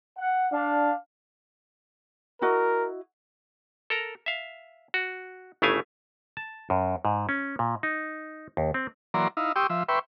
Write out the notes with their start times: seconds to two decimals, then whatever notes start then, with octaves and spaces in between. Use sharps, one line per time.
0.18 F#5
0.53 D4 F5
2.42 E4 F#4 A#4 D#5
3.90 A4 A#4 A#5
4.26 E5 F5
4.94 F#4
5.62 G1 C#3 A3 E4 F5 G#5
6.37 A5
6.70 F#2
7.05 G#2
7.29 C#4
7.59 A#2
7.83 D#4
8.57 D#2
8.74 C4
9.14 E3 F#3 A#3 D5 A#5 C6
9.37 D#4 E4 F5
9.56 G4 G5 C6 C#6 D#6 E6
9.70 F3 E5
9.88 B4 E5 G5 C6 C#6